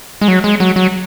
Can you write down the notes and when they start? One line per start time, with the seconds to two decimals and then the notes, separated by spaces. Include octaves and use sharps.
0.21 G#3
0.28 F#3
0.44 G#3
0.60 F#3
0.76 F#3